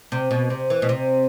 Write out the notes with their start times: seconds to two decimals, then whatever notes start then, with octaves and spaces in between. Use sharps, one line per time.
0.12 C3
0.31 B2
0.50 C3
0.70 E3
0.82 B2
0.89 C3